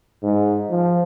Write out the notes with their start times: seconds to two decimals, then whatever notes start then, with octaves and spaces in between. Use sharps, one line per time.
0.23 G#2
0.70 F3